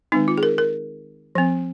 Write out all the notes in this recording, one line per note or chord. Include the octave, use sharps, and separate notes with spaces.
D#3 G#3 C4 D#4
F4
G#4
A#4
A#4
F3 C4